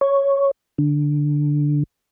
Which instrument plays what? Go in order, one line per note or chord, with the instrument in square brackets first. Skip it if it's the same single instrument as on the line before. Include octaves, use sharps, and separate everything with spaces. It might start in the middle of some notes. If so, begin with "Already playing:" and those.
[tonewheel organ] C#5
D3